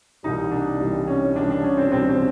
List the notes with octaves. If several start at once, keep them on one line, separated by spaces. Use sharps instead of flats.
C2 C3 E3 G3 D#4
D4
C2 C3 E3 G3
C#4
C2 C3 E3 G3 D4
D4
C#4
C4
C2 C3 E3 G3 C4
C4